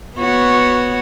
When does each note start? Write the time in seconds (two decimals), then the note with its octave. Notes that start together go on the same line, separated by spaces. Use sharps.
0.18 B3 F#4 C#5